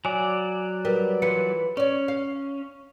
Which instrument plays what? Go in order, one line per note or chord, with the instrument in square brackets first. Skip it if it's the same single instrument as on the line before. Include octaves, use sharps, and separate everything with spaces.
[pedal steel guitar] F#3 D5 [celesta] G#5
[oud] G3 [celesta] A#4 B4
[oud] E3 F4 B4 [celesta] C#7
[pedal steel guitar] C#4 [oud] C#5 D5
[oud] F5